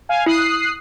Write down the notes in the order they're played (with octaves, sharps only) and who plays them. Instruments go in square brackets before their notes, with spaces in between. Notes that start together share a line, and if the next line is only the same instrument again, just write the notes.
[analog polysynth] F5 G#5
[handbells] E4 [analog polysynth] D#6 F#6 C7